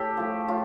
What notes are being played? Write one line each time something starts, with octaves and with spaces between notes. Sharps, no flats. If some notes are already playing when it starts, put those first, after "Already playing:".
Already playing: A2 G4 A4
F3 A3
A2 F4